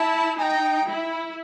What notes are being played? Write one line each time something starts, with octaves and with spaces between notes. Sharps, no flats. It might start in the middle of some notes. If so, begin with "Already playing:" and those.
Already playing: E4 A5
D#4 G5 G#5
E4